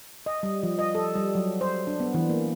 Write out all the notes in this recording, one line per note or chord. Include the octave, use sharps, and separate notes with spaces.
D#5
G3
F3
D#5
A4
G3
F#3
C5
D4
B3
E3
A#3